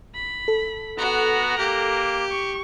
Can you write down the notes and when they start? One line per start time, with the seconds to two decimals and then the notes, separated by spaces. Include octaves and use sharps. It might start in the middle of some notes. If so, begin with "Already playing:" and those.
0.15 B5
0.48 A4
0.98 B3 F#4 A#5 F#6
1.58 A#3 G4
2.31 C#6